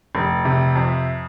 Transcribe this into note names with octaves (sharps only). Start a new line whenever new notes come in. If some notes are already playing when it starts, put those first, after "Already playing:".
F1
C3
F2